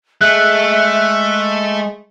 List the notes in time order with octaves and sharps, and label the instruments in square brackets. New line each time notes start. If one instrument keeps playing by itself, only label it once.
[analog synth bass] G#3 [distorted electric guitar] A3 [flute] E5 [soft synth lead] F#6